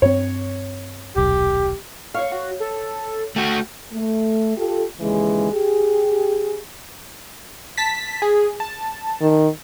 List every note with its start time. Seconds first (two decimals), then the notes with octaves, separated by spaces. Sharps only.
0.02 G2 C4 C#5
1.16 D#1 B1 G4
2.14 C#5 F5 C#6
2.32 F#4
2.60 A4
3.36 A3 F#4 G5
3.92 A3
4.56 F4 G4 A4
5.00 D#2 C#3 E3 G#3
5.51 G4 G#4
7.77 A5 B6
8.22 G#4
8.60 A5
9.22 D#3